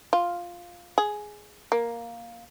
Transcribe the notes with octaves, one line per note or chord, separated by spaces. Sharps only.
F4
G#4
A#3